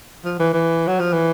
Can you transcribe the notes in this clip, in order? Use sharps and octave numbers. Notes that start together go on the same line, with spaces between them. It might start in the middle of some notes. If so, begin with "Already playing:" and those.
F3
E3
E3
F#3
F3
E3